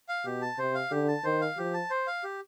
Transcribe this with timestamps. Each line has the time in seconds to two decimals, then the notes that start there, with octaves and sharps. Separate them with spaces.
0.09 F5
0.25 B2 G4
0.42 A5
0.58 C3 C5
0.75 F5
0.91 D3 G4
1.08 A5
1.24 D#3 C5
1.41 F5
1.57 F3 G4
1.74 A5
1.90 C5
2.07 F5
2.23 G4